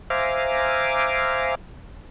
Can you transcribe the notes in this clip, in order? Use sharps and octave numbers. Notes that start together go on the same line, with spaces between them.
C5 E5 F5 G#5 A#5 D6